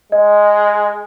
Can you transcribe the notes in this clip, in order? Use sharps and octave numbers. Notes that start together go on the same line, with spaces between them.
G#3 D#5